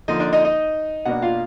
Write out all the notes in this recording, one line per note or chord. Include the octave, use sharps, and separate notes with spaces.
D3 F3 A#3 D#4 D#5
D4 D5
D#4 D#5
D#4 D#5
B2 A#3 D4 F#4 F#5
F4 F5